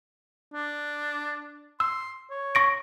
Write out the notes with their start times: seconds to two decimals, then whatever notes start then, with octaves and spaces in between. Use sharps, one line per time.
0.54 D4
1.80 C6 E6
2.30 C#5
2.55 C#6 A#6 D7